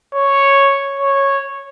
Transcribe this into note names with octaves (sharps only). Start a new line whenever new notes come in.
C#5
C#5